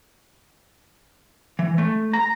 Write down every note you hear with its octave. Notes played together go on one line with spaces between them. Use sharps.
E3
A3
A#5